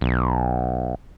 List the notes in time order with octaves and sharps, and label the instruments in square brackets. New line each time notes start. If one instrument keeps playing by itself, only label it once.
[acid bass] B1